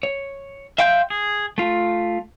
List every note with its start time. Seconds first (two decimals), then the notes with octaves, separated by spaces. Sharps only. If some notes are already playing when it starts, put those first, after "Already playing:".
0.03 C#5
0.78 E5 F5 G5 C6 G6
1.10 G#4
1.58 A3 F4